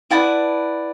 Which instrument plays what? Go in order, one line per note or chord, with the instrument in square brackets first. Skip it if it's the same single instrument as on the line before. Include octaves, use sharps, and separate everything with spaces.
[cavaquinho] E4 B4 D5 F#5 A5